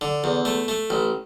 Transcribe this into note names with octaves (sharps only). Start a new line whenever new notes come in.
D3
E2
A3
A3
A1